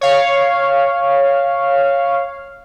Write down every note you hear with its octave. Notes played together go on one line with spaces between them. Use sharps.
C#5 F5